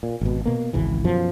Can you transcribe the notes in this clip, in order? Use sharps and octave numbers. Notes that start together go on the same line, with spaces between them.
A#2
G#1 B2
B2 A#3
G#1 C#2 E3
F#2 B2 F3